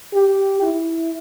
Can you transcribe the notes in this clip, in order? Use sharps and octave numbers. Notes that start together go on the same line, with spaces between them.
G4
E4